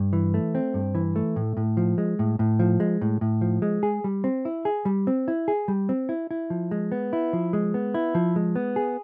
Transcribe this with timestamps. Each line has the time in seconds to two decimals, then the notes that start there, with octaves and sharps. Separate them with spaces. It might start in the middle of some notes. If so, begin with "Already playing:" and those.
Already playing: G2
0.13 E3
0.34 A3
0.55 C4
0.74 G2
0.95 E3
1.16 A3
1.36 A2
1.57 A2
1.77 F3
1.98 G#3
2.19 A2
2.39 A2
2.60 F3
2.80 G#3
3.01 A2
3.21 A2
3.41 F3
3.62 G#3
3.83 G#4
4.04 G3
4.24 C4
4.45 E4
4.65 G#4
4.85 G3
5.07 C4
5.28 E4
5.48 G#4
5.68 G3
5.89 C4
6.09 E4
6.31 E4
6.50 F3
6.71 G#3
6.92 B3
7.13 E4
7.33 F3
7.53 G#3
7.74 B3
7.94 E4
8.15 F3
8.36 G#3
8.56 B3
8.76 G#4